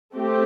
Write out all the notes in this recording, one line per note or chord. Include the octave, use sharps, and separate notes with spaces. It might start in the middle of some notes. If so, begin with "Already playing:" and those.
A3 C4 G4